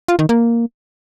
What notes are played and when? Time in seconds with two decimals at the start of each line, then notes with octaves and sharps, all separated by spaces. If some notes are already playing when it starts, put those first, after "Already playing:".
0.08 F4
0.19 D#3
0.29 A#3